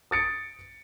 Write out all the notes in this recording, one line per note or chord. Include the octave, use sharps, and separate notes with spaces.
D#6 A6 C#7 D7